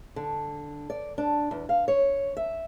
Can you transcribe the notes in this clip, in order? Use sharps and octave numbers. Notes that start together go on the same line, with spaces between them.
D3
D5
D4
E2
F5
C#5
E5